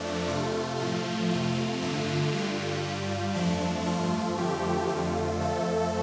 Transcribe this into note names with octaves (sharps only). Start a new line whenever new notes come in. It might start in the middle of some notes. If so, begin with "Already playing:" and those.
Already playing: F2 F3 A3 D4
C3 A3 F4
A2 F3 A3
F2 C3 A3 F4
G2 D3 A3 F4
G2 D3 G3
G2 G3
F2 F3 A3 D4
G2 F3 A3 F4
F2 D3 F3 A3 G4
F2 D3 A3 F4
F2 F3 A3 A4